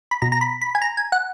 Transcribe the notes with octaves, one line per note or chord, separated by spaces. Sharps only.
B5
B2 A#5
A#5
B5
B5
G#5
A#5
G#5
F#5